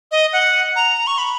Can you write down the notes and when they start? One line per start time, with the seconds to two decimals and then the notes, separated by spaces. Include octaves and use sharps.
0.11 D#5
0.33 F#5
0.76 A#5
1.07 C#6
1.18 B5